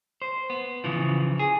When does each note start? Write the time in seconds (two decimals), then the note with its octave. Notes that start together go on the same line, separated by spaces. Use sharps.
0.22 C5
0.50 B3
0.84 C#3 E3 F3
1.39 G#4